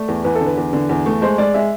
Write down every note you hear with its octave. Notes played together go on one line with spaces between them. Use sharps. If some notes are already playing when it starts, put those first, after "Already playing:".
Already playing: A3 D5
E2
E2 B4
A4
D3
B4
E2
D3
E2
A3
G#3 C5
G#3 D5
G#3 E5